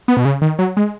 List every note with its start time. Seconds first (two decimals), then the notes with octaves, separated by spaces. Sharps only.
0.08 B3
0.17 B2
0.25 C#3
0.42 D#3
0.59 F#3
0.77 G#3